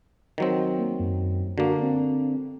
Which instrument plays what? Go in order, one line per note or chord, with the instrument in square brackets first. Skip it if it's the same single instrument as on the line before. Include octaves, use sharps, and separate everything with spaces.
[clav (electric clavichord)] D#3 F#3 C4
[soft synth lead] A#3
F#2
[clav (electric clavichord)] D3 A#3 [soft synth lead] F#4
[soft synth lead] C4